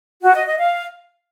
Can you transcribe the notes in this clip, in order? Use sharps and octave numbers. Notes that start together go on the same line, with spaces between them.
F#4
D#5
D#5
F5